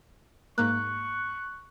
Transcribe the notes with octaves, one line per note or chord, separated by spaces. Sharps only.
G#2 A#3 C#6 F#6